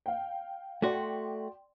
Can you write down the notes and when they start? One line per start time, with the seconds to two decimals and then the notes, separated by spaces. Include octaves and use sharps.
0.06 F5 G5
0.82 A3 F#4 D5 G5 C6